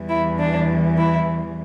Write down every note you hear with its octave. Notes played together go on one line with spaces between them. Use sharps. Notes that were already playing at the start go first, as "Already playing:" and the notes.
Already playing: E2 E3 G3
E4
D4
E4